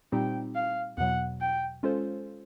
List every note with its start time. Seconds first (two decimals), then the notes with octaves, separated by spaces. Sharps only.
0.12 A#2 G3 C4 D#4 G4 G5
0.55 F5
0.98 E2 B2 F#3 F#5
1.41 G5
1.83 G#3 C#4 F4 A4 C5